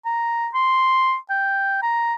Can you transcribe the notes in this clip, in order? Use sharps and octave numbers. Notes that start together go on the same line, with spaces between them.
A#5
C6
G5
A#5